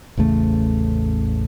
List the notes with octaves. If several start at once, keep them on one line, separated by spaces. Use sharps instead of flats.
A1 E2 C#3 A3